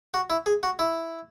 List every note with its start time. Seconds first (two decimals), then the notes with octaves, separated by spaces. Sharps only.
0.14 F#4
0.30 E4
0.46 G#4
0.63 F#4
0.79 E4